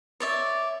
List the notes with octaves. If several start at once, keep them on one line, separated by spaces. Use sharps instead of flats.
C#5 D5 E5